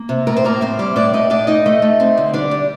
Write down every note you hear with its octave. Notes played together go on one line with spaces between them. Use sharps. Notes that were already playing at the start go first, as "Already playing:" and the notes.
Already playing: A#3
C3
A2 A#4
C5
A2 A#3 A#4
A2 C4 C5
G3
A2 D4 D5
A2 D#4 D#5
A2 D4 D5
A2 D#4 D#5
A3
A3
C4
D3
G3 D4 D5
G3